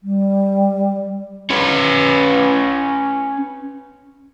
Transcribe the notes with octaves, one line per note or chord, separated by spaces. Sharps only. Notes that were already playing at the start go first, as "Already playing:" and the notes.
G3
C#4 B4